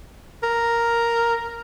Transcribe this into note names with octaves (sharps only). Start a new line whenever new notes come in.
A#4